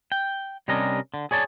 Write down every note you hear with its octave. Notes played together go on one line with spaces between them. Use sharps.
G5
C3 G3 C#4 D4 A#4 D#5
D3
G#4 C#5 D5 A5